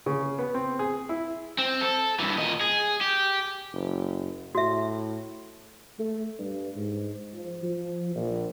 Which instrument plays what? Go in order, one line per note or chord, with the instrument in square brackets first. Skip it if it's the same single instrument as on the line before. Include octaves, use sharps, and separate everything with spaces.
[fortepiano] C#3
B3
C4
G#4
E4
[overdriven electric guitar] C4
A4
G2 E3
A#2 D#5
G#4
G4
[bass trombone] F#1
[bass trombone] A2 [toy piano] F#4 E5
[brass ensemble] A3
G2
G#2
F3
F3
A#1